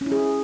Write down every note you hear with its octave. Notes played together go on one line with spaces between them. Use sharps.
C#4
E4
G#4